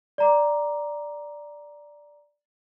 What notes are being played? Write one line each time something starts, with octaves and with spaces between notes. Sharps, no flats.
D5 A#5 D6